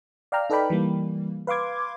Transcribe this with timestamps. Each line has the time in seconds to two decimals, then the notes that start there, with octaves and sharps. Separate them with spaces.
0.32 D5 F5 G5 A#5 F6
0.50 D#4 A4 B4 D5 G5 B5
0.70 E3 G3 A#3
1.47 B4 F5 C6 D6 G#6